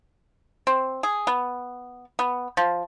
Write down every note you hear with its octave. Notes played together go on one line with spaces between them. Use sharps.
C4
G#4
B3
B3
F3